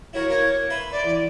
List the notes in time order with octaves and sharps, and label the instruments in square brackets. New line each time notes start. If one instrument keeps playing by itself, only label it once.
[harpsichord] E4 F#4 A#4 [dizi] C#5
[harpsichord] A#3 A#4
[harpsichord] B4 E5 C6 [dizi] B5
[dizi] D5
[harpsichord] E2